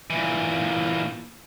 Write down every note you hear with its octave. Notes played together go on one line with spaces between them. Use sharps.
A#2 E3